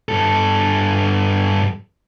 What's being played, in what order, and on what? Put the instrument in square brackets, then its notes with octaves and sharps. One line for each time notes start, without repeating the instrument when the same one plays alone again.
[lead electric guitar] G2 A4